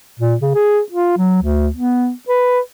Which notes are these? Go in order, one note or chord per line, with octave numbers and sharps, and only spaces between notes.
A#2
C#3
G#4
F4
F#3
D2
B3
B4